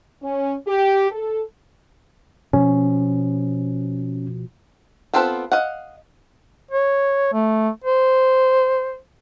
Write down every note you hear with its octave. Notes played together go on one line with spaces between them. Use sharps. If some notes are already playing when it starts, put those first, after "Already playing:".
C#4
G4
A4
B2 F3 C#4
B3 C4 F4 A4 B4
D#5 F5 F#5
C#5
A3
C5